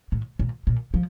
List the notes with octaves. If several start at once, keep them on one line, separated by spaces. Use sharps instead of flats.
A2
A#2
A#2
F3